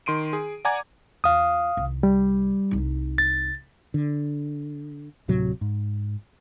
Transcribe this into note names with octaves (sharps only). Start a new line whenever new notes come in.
D#3 C6 D7 D#7
G#4
D5 F#5 G#5 A#5 D6 G#6
E2 F4 F5 D#6
C2 D#3
G3
C2 D#4
A6
D3
D1 A2 C3 F#3
G#2